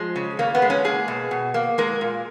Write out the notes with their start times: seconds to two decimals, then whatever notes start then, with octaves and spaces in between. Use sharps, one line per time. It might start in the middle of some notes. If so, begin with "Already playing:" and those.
Already playing: F3 G#3
0.16 C#3
0.39 C#3 A#3
0.55 B3
0.62 G#3
0.70 C#4
0.84 A#3 G#4
1.08 B2
1.31 B2
1.54 A#3
1.78 G#3 A#4
2.01 A#2